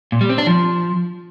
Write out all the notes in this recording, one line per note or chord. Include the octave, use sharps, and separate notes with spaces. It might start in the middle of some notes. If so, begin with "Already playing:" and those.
A#2
G3
C4
D4
F3